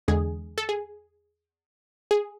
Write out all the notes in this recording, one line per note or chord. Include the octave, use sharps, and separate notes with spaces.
E2 D3 G#3 G#4
A4
G#4
G#4